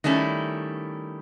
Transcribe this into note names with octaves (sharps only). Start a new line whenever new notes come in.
D#3 G3 A3 C#4 E4